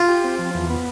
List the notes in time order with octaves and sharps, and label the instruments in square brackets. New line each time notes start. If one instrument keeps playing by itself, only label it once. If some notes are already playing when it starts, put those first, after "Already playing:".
Already playing: [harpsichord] F4
[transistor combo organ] G4
C4
F3
E2
B3